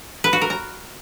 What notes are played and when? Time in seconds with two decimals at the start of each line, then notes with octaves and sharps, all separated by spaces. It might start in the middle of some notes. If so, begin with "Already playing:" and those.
0.24 B4
0.33 F#4
0.41 A#4
0.50 A#5